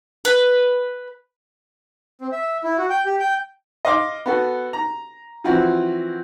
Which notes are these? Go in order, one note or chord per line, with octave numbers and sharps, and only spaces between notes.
B4
C4
E5
E4
F#4
G5
G4
G5
D#5 F5 C6 D6
B3 F#4 A4
A#5
E3 F3 C4 E4 F#4